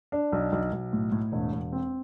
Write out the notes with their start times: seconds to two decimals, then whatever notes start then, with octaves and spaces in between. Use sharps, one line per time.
0.12 D4
0.32 B1
0.52 B1
0.72 B1
0.93 A2
1.12 A2
1.32 E1
1.52 E1
1.73 C4